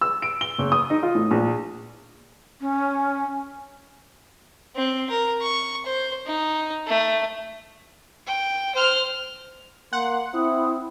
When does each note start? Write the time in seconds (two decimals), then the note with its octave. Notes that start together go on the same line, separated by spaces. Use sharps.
0.01 E6
0.22 D7
0.41 G7
0.58 F#1
0.72 D#6
0.90 D#4
1.03 F4
1.15 A2
1.31 A#1
2.61 C#4
4.76 C4
5.10 A#4
5.42 C#6
5.86 C5
6.26 D#4
6.87 A3
8.27 G5
8.75 C5 F6
9.93 A#3 F#5 C6
10.35 C4 E4 D#6